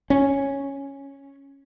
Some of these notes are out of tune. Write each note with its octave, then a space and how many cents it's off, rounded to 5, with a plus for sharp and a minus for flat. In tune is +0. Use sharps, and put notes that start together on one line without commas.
C#4 -5